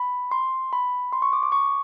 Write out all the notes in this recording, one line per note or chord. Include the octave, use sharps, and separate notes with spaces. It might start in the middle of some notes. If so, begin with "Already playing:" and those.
Already playing: B5
C6
B5
C6
C#6
D6
D6
C#6